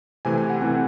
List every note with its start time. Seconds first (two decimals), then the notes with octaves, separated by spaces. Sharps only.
0.25 C3 E3 A3 C4 G#5
0.38 G#5
0.50 F#5
0.62 C3 E3 A3 C4